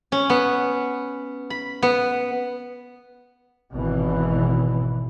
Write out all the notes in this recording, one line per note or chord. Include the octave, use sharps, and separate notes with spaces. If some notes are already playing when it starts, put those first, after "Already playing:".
C#4
B3
B5
B3
G#1 B2 E3